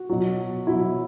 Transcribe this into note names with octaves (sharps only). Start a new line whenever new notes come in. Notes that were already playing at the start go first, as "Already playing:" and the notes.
Already playing: F#4
B2 F#3
B2 F#3 E4